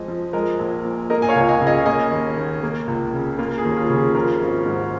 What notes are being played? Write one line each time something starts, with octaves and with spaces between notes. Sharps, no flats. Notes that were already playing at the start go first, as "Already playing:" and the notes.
Already playing: F2 G#3 D#5
F3
G#3 A#4 D#5
A#1
A#2
A#3 A#4 D#5
G#5
C#5 F5
C#2
D#5 G#5
C#3
D#5 G#5
A#3 D#5 G#5
D#2
D#3
A#3
C#2
C#3
A#3 F4
G#4
D#2
F4
C#3
G#4
F3 F4 A#4
G#1
G#2